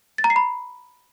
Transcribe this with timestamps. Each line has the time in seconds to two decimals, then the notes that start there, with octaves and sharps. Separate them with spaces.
0.18 A6
0.24 A#5
0.30 C7
0.36 B5